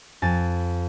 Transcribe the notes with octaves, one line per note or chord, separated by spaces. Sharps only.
F2 G#5 A6